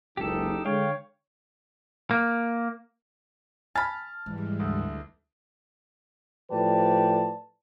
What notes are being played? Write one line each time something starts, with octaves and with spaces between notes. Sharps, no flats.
F#1 C#2 D#4 G4 A4
D3 G#3 C#5 F5 G5
A#3
G#5 A5 B5 F6 A6
G#2 E3 G3 G#3
D2
A2 F3 G4 B4 D5 A5